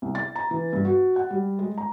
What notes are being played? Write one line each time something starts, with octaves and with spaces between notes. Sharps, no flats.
C2
A6
A#5
E3
G2
F#4
F#5
G3
G#3
A#5